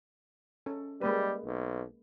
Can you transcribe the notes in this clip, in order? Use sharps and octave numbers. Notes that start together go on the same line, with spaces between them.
C#4 A4
G3 G#3 A#3 B4
B1